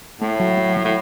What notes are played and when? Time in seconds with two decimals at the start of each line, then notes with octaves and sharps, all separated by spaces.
0.21 A2 A3
0.40 F#3
0.57 F#3
0.77 F#3
0.85 A2